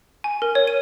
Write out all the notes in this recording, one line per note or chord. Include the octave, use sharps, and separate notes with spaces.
G#5
A#4
C#5
D#7